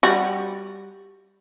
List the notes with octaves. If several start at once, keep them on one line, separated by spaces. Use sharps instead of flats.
G3 F#4